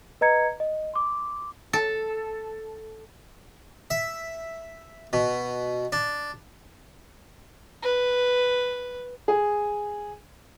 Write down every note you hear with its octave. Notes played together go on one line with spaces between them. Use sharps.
B4 D#5 A#5 G#6 C#7
D#5
C6 D6
A4
E5
B2
D4
B4
G#4